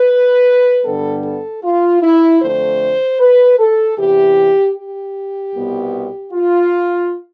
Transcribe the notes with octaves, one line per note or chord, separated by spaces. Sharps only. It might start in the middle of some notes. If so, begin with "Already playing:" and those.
Already playing: B4
G2 D3 G3 B3 A4
A4
F4
E4
F2 D3 A3 C5
B4
A4
E2 C3 E3 G4
G4
C2 B2 B3
F4